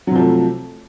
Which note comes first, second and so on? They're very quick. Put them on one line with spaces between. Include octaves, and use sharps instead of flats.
F#3 C3 F3 A3